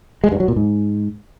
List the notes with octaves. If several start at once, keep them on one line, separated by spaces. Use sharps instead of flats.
G#3
G2
F#3
A#2
G#2